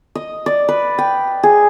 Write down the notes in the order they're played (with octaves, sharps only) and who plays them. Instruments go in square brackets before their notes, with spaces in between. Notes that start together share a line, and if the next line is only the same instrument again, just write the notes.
[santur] D#5
D5
B4
G5
G#4